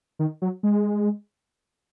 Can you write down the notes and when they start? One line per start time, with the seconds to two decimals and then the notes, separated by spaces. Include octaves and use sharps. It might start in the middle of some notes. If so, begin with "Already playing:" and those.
0.19 D#3
0.42 F#3
0.63 G#3